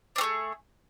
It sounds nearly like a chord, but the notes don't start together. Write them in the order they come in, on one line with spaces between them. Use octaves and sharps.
D4 C4 A3 G#4